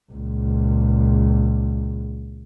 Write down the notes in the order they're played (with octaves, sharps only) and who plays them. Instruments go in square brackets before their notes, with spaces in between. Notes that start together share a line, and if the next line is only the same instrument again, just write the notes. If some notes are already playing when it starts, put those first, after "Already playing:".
[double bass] C#2 A#2